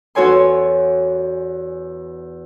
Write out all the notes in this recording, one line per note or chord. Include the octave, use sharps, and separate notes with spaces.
E2 F#4 A4 C#5 G#5 C6